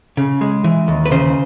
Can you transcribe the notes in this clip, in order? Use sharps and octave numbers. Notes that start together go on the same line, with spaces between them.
C#3
G#3
E3
D#2
B4
C#3 C5